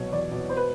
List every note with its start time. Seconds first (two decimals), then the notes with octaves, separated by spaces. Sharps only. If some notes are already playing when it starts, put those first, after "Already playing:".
Already playing: C2 B2 F#3 C#5
0.12 E2 D5
0.31 B2
0.49 C5
0.57 B4